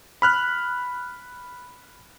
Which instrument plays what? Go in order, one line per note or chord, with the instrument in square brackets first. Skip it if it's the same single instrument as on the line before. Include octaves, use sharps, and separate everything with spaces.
[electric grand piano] B5 F6 F#6